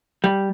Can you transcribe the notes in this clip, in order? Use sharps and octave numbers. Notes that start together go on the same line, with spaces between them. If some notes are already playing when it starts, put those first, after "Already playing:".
G3